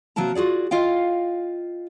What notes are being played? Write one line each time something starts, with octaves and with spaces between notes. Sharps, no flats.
C3 F#3 A#3 A#4 A5 A#5
F4 F#4 G#4 D5
F4 D#5 F5 G5